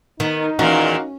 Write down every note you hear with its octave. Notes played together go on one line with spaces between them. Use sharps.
D#3 B3 D#4
E2 A#2 D#3 C#4 F#4 A#4 F5